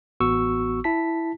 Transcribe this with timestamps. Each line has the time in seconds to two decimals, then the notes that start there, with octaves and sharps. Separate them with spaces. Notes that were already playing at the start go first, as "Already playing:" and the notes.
0.20 A1 B3 F#4 C#6 E6
0.84 E4 A5 B6